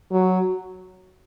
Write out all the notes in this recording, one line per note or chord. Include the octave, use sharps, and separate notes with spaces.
F#3